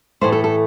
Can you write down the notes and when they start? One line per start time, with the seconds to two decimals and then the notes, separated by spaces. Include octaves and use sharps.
0.21 A2 E3 A3 C5
0.32 A4
0.44 A4